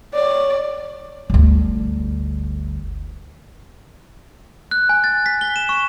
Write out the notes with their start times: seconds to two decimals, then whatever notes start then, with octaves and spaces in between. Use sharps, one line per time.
0.13 C#5 D5
1.30 G1 D2
4.71 F#6
4.89 G#5
5.04 A6
5.26 B6
5.41 G7
5.56 E7
5.69 C#6